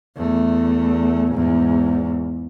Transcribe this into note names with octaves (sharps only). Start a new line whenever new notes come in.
E2 A3
E2 G#2